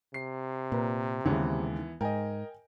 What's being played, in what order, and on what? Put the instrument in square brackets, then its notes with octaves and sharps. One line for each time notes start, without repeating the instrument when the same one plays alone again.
[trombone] C3 [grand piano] C7
[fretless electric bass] A#2 [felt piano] B4 A#5
[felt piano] D#2 G#3 [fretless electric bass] C#3 [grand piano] E3 B3
[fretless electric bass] G#2 [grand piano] A#4 D#5 [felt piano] G5 G#5